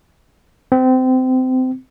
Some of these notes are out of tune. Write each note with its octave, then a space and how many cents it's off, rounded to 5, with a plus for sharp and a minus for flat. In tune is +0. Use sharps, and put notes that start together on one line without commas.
C4 -25